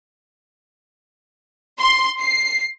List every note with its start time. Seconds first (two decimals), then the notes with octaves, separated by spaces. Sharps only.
1.80 C6
2.20 C7